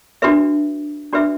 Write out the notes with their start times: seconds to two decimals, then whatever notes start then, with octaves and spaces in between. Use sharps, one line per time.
0.22 D4 F#4 B4 E5
1.13 D4 F#4 B4 E5